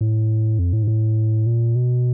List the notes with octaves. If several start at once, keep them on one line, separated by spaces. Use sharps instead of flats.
A2
F2
A2
G#2
A2
A#2
B2